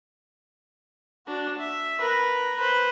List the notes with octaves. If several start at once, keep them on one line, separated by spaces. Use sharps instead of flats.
D4 F#4
E5
A#4 B4
B4 C5